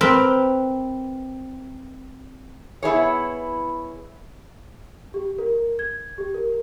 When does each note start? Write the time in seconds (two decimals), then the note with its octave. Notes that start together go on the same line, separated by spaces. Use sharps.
0.01 C4 A#4 B4
2.83 B3 E4 G#4 C#5
5.14 G4
5.38 A#4
5.79 G#6
6.18 G4
6.34 A#4